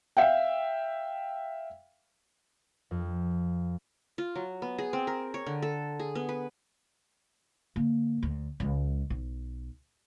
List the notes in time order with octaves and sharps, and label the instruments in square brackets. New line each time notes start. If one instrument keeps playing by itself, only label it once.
[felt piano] E5 F5 G5
[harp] F2
[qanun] F4
F#3
B3
G#4
C4
A#4
C#5
D3
A4
G#4
B3
B4
[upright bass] D3 A#3
D2
C#2 G#3
B1